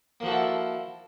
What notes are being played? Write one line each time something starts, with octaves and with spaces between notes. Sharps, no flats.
F3 A#3 E4 F#4 A4